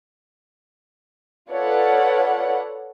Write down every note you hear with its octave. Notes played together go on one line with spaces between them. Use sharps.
F4 A4 B4 C#5 D5 F#5